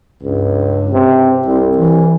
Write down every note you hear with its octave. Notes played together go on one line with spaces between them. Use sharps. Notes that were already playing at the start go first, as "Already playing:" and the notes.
C#2 G2
C3
C2 C4
E3